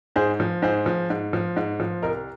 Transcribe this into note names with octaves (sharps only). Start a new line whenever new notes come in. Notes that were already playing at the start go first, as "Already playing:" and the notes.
G#2 G#4 C5
F3
G#2 G#4 C5
F3
G#2
F3
G#2
F3
C2 A#4 D#5